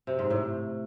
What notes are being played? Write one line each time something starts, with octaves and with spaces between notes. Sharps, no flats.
C3
G#2
A2